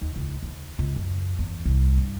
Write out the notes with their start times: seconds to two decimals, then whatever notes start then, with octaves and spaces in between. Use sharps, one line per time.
0.01 D#2
0.16 C#2
0.43 D#2
0.79 C#2
0.96 F#2
1.39 E2
1.66 C2
1.98 G2